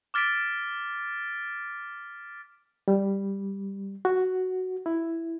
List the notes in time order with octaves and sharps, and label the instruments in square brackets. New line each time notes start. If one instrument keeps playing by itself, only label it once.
[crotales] D6 F6 A6 B6 D7
[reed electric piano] G3
F#4
E4